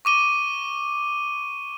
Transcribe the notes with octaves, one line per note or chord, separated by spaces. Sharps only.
C#6 D6 D#7 G7